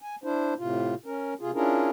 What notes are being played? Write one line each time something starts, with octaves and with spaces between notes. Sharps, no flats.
G#5
D4 E4 C5
A2 C3 F4
C#4 A#4
C3 F4 G#4
C#4 D4 E4 F4 G#4 A#4